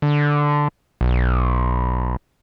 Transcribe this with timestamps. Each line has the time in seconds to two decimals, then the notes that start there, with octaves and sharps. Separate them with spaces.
0.02 D3
1.01 B1